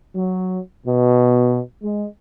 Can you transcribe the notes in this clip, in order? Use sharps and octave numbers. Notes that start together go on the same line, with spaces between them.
F#3
B2
G#3